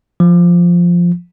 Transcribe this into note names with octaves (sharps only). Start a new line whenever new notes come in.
F3